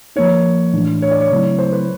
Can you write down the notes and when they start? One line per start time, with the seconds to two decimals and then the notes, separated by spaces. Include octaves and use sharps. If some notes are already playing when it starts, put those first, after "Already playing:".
0.16 F3 A#3 D#4 C#5
0.73 A2 E3 A3 D4
1.02 C#5
1.11 D5
1.21 C#5
1.31 C#3 F#3 A3 C4 E4
1.59 C5
1.73 B4